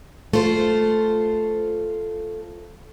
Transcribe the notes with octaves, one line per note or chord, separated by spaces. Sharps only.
A3 F4 C5